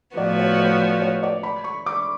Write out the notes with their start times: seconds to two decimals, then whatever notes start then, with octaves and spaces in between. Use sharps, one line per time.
0.17 A2 F3 B3 F#4 D5
0.39 C#5
0.60 C#5
1.02 C#5
1.23 D5
1.43 B5
1.64 C#6
1.86 D6